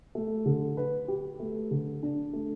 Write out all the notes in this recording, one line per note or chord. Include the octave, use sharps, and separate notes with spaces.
A3
D3
B4
G4
A3
D3
D4
A3